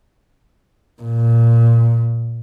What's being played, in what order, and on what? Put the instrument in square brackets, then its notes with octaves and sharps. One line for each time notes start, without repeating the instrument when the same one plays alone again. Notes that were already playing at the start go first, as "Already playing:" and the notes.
[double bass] A#2